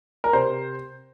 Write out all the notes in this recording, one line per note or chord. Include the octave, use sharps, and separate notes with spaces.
A#4
C3 C5